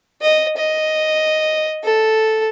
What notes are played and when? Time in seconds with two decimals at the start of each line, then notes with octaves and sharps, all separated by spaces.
0.22 D#5
0.57 D#5
1.84 A4